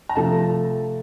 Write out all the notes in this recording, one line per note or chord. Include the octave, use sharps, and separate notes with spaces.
A#5
C3 F3 A3 A5